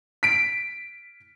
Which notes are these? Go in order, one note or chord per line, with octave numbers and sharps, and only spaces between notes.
B6 D7